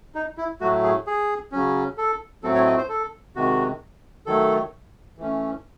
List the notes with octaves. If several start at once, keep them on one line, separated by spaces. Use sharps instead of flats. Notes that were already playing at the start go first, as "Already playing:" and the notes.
D#4
E4
A2 F#3 A3 F#4
G#4
G#4
C#3 F#3 C#4
A4
A2 F#3 A3 C4 A4
C#5
D#5
C5
A4
C3 D#3 G#3 F#4
D#3 F#3 A3 A4
E3 A3 C#4